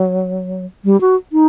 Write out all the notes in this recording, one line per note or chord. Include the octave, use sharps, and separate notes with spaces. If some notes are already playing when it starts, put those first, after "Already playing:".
Already playing: F#3
G3
F#4
D#4